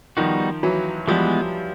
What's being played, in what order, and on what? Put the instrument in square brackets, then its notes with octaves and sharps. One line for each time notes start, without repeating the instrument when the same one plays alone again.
[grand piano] D#3 F3 [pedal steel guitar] G3 B3 D#4 F#4
[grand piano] E3 F#3
[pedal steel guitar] E3 G#3 B3 [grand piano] F3 G3